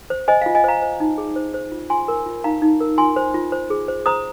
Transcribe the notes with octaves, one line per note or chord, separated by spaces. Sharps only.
C5
C5 D#5 G#5
F5
F4
D#5 G#5
C5 F5 A#5
C5
D#4
G#4
C5
C5
F4
F4 G#5 C6
A#4
F4
D#4 F5 A#5
D#4
A#4
F4 G#5 C6
C5
F4
C5
G#4
C5
C5 A#5 D#6